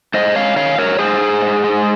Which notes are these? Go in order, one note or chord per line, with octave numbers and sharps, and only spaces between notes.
G#2 C5 D#5
G#3 C#5 F5
D#3 C#5 F5
G#2 A#4 C#5
G#2 G#4 C5
G#2
G#2
G#3